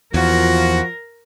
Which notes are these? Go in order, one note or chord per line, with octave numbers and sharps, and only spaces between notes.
E2 F3 A#3 F4 F#4 A#4